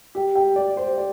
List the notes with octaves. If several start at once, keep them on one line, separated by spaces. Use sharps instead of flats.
G3 G4
G5
G3 D5
C5
G3 D5